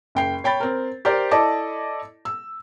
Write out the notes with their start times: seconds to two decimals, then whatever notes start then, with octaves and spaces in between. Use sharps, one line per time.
0.15 F#1 G5 C7
0.44 C#5 G5 B5 A6
0.60 C4 A#4
1.05 G4 A#4 C5 D5
1.31 E4 A4 D5 D#5 A5 D6
2.25 E6